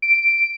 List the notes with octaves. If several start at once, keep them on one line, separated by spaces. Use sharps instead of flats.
D7